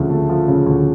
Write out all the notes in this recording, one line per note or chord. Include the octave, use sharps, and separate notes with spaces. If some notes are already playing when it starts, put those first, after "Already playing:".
Already playing: D2 C#3 F3
A3
F3
C#3
D2